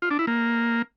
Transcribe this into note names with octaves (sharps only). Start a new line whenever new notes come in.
F4
D4
E4
A#3